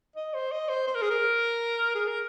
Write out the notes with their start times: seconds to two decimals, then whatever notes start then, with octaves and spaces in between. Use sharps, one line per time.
0.16 D#5
0.34 C5
0.52 D#5
0.69 C5
0.87 C5
0.95 A#4
1.02 G#4
1.11 A#4
1.95 G#4
2.08 A#4